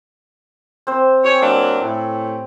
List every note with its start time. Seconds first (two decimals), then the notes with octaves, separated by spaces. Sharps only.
0.87 C4 C5
1.24 G4 C#5 G#5
1.42 F#3 A#3 D4
1.81 A2